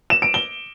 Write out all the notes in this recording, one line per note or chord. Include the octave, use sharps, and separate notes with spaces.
E7
D7
G7